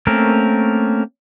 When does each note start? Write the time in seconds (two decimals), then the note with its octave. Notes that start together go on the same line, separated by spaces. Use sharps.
0.07 A3 A#3 C4 C#4 A#4